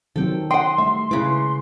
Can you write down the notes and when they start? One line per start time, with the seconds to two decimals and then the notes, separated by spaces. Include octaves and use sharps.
0.16 D#3 F#3 C4 A4 G5
0.51 D#5 F#5 G5 C6
0.78 G3 A3 E5
1.11 C#3 G#3 E4 B4 D6